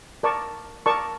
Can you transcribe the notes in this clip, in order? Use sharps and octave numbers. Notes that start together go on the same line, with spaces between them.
A#4 D5 A5 C#6
A#4 D5 A5 C#6